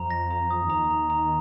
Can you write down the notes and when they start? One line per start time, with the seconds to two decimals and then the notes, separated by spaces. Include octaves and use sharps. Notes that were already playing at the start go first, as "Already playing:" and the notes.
Already playing: F2 F3 A#5
0.10 A#6
0.31 A#5
0.51 D#6
0.70 D#2 D#3 A#5
0.91 A#5
1.10 A#5